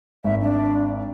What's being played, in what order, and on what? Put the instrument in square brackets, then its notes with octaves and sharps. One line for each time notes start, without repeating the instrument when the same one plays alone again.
[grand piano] G#1 [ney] E5
[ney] D4